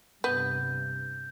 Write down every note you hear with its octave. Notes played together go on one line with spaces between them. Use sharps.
G2 C3 B3 G6